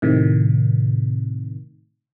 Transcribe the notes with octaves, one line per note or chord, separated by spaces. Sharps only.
A2 C3 D#3